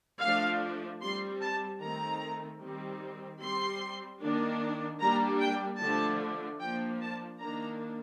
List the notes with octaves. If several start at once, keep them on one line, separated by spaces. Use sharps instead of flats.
F3 A3 D4 F5
G3 C4 C6
A5
D#3 A3 C4 A#5
D#3 G3 C4
G3 C4 C6
D#3 A#3 D4
G3 A#3 D4 A#5
G5
D3 F3 A3 D4 A5
F3 A#3 D4 G5
A5
D#3 A#3 D4 A#5